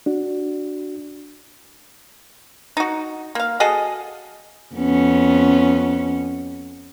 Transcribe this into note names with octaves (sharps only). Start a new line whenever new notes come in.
D4 F#4
D#4 F#4
A#3 F5
F#4 G#4 A4 D#5
F2 B3 C#4